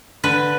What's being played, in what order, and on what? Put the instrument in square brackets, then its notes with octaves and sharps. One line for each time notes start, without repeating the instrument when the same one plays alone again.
[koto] D3 B4